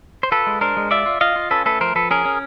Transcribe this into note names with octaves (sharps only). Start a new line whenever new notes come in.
C5
F4 A4 B4
G#3
D4 A#4 C5
G#3
F4 D5 E5
F4
F4 D#5 F5
F4
C#4 A4 B4
A3 A4 B4
F3 A#4 C5
F3 A4 B4
C#4 G#4 A#4
C#4